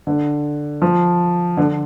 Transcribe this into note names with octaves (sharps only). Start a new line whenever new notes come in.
D3
F3
D3